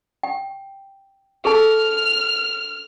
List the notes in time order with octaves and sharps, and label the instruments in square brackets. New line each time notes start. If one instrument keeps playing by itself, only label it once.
[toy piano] G5
[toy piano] G#4 A4 A5 [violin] F6